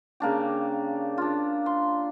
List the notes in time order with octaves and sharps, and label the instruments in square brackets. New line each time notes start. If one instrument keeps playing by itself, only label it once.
[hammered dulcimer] C#3 A#3 D4 G4
D4 F4
C6